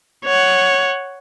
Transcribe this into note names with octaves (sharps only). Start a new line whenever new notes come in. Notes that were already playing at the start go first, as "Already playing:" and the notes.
C#5 F#5